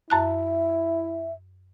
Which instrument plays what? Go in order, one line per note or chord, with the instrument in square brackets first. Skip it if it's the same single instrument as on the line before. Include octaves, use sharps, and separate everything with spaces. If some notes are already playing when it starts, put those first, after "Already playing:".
[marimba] F#2 A5 F#6 [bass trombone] E4 [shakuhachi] E5